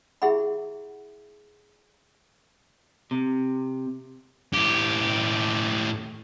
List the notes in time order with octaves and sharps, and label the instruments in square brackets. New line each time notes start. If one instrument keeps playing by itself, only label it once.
[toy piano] E4 G4 G#4 E5 F#5 B5
[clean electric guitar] C3
[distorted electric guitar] A2 G4